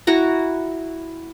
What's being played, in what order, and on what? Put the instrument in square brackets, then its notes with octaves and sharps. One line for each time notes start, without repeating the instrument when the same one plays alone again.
[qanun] E4 F#4 A#5